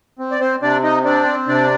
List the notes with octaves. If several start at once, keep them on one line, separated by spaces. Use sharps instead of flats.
C4
D5
C4 C5
C3 D4 D5
D#4 D#5
C4 D4 D5
C3 D4 D5